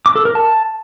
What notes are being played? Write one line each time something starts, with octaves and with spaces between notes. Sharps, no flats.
D6
A4
A#4
A5